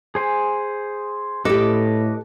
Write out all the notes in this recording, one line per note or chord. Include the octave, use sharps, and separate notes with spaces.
G#4 C5 G#5
A2 G4 A4 B4 D#5 D6